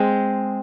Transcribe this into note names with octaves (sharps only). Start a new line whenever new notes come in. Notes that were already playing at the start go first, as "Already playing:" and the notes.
Already playing: G#3 C4